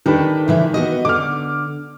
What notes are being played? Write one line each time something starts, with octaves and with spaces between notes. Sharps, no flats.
D#3 D4 G4 A4 B4
C#3 E3 E4
B3 F#4 D#5
D3 D6 F6